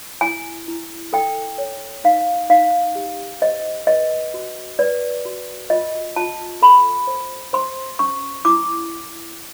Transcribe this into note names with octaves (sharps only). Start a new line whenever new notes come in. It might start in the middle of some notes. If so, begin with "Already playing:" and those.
E4 G#5
E4
A4 G5
C#5
D#4 F5
D#4 F5
G4
C5 D#5
B4 D#5
F#4
B4 D5
F#4
F4 D#5
F4 A5
A4 B5
C5
C5 C6
C#4 C#6
E4 D6